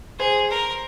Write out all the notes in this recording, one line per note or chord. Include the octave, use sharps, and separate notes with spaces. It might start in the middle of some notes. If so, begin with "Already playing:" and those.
G#4 C5
A#4